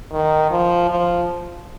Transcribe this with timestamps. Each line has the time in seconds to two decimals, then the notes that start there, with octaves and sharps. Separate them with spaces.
0.12 D#3
0.51 F3
0.90 F3